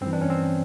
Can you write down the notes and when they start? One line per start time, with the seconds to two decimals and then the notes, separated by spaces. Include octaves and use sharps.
0.01 G2 C4
0.06 E3
0.13 D4
0.21 C#4
0.30 C4